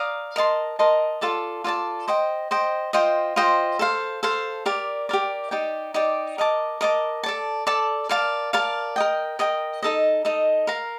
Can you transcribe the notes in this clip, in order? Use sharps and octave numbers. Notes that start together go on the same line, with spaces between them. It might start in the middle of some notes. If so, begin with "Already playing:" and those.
Already playing: D5 F5 A#5 D#6
A#4 D#5 A5 C6
A#4 D#5 A5 C6
F4 A4 D5 A5
F4 A4 D5 A5
C5 D#5 G5
C5 D#5 G5
F4 C5 D#5 G5
F4 C5 D#5 G5
A4 C5 F5
A4 C5 F5
G4 A#4 D5
G4 A#4 D5
D#4 G4 D5 G5
D#4 G4 D5 G5
A#4 D#5 A5 D6
A#4 D#5 A5 D6
A4 D5 A5
A4 D5 A5
A#4 D5 F5 A5
A#4 D5 F5 A5
A#4 D#5 G5
A#4 D#5 G5
D#4 A4 D#5
D#4 A4 D#5
A#4 F5 A#5